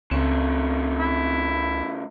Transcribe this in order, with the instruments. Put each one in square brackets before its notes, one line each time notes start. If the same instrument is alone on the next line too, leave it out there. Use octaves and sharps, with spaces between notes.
[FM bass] C#2 [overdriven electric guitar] C#3 A3 [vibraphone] C4
[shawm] E4